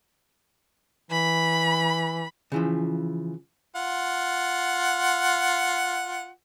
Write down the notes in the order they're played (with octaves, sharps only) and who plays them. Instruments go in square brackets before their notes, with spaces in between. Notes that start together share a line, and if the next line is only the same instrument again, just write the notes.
[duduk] E3 [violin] B5
[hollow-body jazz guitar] C#3 E3 F3
[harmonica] F4 F#5